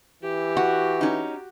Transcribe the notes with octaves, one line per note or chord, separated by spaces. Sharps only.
E3 G4
F#4
C#4 D#4